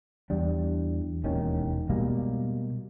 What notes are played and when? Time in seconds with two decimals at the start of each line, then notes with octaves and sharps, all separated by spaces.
0.30 E2 G3 D4
1.24 E1 D#2 D#3 C#4
1.89 B2 G3 G#3 A#3